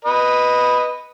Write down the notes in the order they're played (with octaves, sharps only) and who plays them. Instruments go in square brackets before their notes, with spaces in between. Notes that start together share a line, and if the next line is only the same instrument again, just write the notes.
[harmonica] B4 D#5